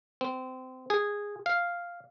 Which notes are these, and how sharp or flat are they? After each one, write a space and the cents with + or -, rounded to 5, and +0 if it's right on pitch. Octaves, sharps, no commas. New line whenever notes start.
C4 -25
G#4 -10
F5 +0